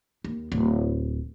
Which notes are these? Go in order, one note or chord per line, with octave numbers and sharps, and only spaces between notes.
D#2
D1